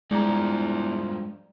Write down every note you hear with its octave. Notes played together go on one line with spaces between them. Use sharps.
E2 G2 F3 G#3 D5 A#5